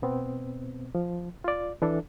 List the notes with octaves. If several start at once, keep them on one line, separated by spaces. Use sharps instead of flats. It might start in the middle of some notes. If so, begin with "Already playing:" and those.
B2 B3 C4
F3
F4 D5
E3 D4 A4